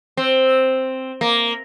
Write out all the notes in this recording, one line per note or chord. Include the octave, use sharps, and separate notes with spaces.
C4
A#3